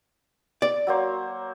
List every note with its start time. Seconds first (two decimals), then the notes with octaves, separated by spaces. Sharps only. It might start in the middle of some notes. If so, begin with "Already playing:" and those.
0.62 D5
0.87 F#3 A#3 C5